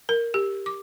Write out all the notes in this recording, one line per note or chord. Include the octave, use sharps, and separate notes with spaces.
A#4
G4
D6